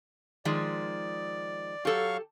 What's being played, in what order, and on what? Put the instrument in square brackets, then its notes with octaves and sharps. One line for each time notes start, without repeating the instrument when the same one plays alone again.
[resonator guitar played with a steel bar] D#3 F3 G#3 [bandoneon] D5
[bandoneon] F#3 F5 C#6 [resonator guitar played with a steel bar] G4 A4